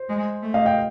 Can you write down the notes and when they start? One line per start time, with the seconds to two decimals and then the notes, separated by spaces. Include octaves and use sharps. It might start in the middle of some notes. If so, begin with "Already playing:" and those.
Already playing: C5
0.09 G#3
0.42 A3
0.54 D#5 F5
0.66 F5 G5